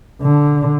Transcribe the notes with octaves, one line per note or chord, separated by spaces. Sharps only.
D3